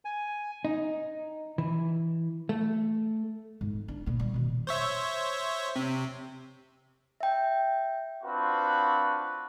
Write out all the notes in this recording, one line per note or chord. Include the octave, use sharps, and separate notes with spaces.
G#5
D#4
E3
A3
G#2
D4
A#2 B3
G3
B2 D#3
C5 C#5 E5
C3
E5 G5
C4 D4 F4 F#4 B4